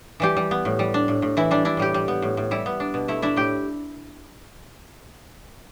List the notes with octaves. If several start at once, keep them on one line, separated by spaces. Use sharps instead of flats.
E3 G3 G4
G3
B3
A2
G3
D4
A2
A2
E3 E4
G3 D4
D4 E4
A2 G3 G4
G3
B3
A2
A2
G3 E4
B3
D4
B2
A3 E4
D4 E4 E5
A2 G4 G5